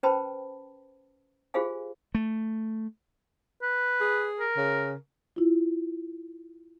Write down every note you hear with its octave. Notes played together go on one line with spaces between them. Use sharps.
C#4 B4 C5 G5 A5 B5
F4 G4 G#4 C5 F5 G#5
A3
B4
G#4
A#4
C#3
E4 F4